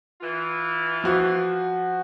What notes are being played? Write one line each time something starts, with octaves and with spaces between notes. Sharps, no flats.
E3 F4
F3 F#4